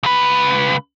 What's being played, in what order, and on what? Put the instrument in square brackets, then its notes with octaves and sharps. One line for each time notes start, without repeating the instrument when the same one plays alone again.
[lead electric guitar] C#2 B4